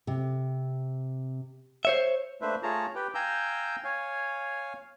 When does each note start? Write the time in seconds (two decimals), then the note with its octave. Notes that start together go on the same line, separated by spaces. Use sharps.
0.07 C3
1.85 C5 C#5 E5
2.42 A3 A#3 D4 B4 C5 E5
2.63 A3 F4 G#4 C#5 A5 A#5
2.95 G4 B4 G5
3.15 F5 G5 G#5 A#5 E6 G6
3.84 C#5 F5 G#5